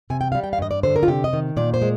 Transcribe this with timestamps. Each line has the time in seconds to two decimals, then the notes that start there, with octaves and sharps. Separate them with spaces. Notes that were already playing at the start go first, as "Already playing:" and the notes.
0.10 C3 G#5
0.21 G5
0.32 G3 F5
0.43 G5
0.53 F5
0.59 G2 D#5
0.71 D5
0.83 D3 C5
0.96 A#4
1.03 F4
1.08 C3 G4
1.24 D#5
1.33 D#3
1.57 A#2 D5
1.74 C5
1.82 G#3